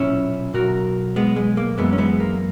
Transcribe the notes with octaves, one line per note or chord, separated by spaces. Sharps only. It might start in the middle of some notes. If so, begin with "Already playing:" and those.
Already playing: B1 A#2 C#4 E4
B1 B2 F#4 A#4
G#3 B3
G#3
A#3
F#2 E3 G#3 B3
C#4
G#3 B3
A#3